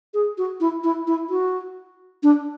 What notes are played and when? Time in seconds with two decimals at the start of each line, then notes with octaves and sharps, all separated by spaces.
0.14 G#4
0.38 F#4
0.60 E4
0.84 E4
1.07 E4
1.30 F#4
2.23 D4